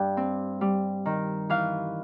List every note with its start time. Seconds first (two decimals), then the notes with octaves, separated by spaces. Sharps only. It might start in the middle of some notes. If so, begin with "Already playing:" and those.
Already playing: G2 G5
0.17 C4
0.61 G3
1.06 D#3
1.49 E3 F5